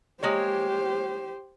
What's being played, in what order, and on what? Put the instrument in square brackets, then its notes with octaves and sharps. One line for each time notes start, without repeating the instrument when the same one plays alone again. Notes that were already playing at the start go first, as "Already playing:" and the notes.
[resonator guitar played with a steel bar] G#3 A#3 C#5 [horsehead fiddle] G4 C5